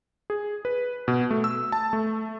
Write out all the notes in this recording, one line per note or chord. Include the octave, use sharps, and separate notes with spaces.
G#4
B4
B2
A3
E6
A5
A3